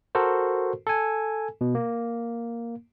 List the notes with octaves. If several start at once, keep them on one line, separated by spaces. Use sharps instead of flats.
F#4 A4 A#4 C5
A4 G#5
B2
A#3